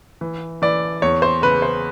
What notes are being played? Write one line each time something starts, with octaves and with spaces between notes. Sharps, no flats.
E3
E3 D5
E2 C#5
C5
C#3 B4
C5